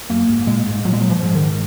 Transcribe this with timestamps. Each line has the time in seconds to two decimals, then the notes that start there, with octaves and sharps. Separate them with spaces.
0.10 F#2 A#3
0.29 G#2
0.47 A#2 G#3
0.66 G#2
0.85 A#2 F#3
0.93 G#3
1.01 F#3
1.10 F3
1.22 G#2
1.35 D#3